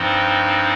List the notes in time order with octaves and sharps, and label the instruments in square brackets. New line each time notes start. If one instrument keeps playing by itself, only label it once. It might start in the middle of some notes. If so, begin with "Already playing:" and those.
Already playing: [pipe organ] G2 F3 C4 D#4